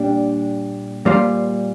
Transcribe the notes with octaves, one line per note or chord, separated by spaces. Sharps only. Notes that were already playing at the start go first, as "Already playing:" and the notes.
Already playing: A#2 G3 D4 G4
A#2 G3 A#3 F4 C5